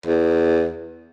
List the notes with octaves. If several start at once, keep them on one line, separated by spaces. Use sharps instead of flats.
E2